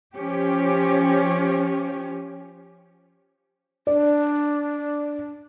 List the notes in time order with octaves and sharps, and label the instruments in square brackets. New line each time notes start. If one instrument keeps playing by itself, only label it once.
[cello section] F3 C#4 G4
[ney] D4 [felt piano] D5